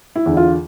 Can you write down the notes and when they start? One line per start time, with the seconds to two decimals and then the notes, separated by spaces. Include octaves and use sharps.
0.16 E4
0.26 E2 D3
0.37 F4